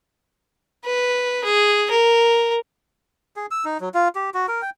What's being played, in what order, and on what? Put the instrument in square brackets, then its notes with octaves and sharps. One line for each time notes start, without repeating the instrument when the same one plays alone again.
[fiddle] B4
G#4
A#4
[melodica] G#4
E6
D#4
F#3
F4
G4
F#4
A#4
G5